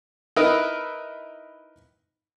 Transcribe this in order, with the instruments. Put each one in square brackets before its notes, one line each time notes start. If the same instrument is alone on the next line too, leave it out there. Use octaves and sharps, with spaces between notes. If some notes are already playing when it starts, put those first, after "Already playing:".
[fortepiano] D#4 E4 A#4 B4